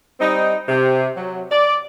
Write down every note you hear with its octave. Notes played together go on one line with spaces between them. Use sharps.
G3 C4 D#4
C3
F#3
D5